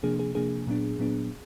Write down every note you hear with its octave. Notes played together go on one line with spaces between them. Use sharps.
C3 F3 A#3 D4 G#4
G#4
C3 F3 A#3 D4 G#4
A#2 F#3 B3 D4
A#2 F#3 B3 D4